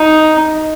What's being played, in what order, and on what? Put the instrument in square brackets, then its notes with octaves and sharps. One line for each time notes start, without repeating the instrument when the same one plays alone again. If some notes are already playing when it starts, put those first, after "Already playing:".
Already playing: [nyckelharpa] D#4